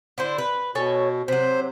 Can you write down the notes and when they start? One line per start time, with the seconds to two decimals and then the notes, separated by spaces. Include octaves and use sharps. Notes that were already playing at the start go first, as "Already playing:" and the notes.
0.18 D3 E4 C5
0.38 B4
0.75 B2 A4 C#5 G#5
1.28 C3 F#3 C5